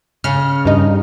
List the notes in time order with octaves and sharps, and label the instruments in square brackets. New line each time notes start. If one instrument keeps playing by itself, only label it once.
[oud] C#3 [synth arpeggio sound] F6
[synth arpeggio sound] G2 D#4